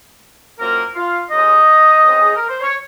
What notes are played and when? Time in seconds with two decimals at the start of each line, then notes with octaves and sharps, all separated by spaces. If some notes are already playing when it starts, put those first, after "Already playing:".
0.59 F#2 F3 A#3 C4 A#4
0.95 F4 F5
1.30 D#2 C#3 F3 G#3 D#4 D#5
2.02 C#2 C#3 G#3 C4
2.22 G#4
2.35 A#4
2.48 C5
2.61 C#5